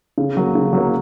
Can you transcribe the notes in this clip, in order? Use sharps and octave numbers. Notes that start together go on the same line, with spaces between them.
C#3
F#3 A#3
C#3
F#3 A#3